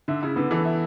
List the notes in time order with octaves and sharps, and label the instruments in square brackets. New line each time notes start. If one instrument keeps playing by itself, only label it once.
[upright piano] D3 [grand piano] E5
[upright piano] C#3 [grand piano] E4
[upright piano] D3 [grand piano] B3
[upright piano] E3 [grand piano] A4
[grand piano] E5